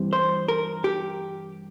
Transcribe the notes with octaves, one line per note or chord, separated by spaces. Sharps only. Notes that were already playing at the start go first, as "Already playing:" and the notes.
Already playing: G2 E3 G3 C4
C5
A#4
G4